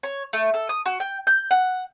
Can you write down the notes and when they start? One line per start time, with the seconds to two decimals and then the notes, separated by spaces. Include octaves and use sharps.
0.03 C#5
0.33 A3
0.54 A4
0.69 D#6
0.86 F#4
1.00 G5
1.27 G6
1.51 F#5